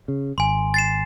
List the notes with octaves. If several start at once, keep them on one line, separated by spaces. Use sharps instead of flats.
C#3
G#1 G#5 C6
A6 C7 E7